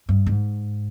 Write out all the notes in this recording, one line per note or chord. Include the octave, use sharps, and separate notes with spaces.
G2
G#2